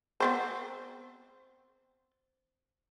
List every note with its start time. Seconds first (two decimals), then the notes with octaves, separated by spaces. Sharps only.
0.20 B3 C4 C5